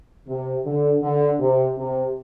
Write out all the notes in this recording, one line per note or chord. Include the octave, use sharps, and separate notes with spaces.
C3
D3
D3
C3
C3